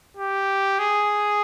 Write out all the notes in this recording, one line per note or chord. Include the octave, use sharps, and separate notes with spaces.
G4
G#4